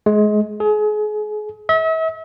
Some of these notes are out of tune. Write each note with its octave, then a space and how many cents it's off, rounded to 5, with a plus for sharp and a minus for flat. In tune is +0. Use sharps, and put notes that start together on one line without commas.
G#3 +25
G#4 +35
E5 -40